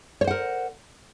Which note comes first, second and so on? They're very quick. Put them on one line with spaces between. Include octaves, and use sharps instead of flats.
C#5 C5 F#5 A#4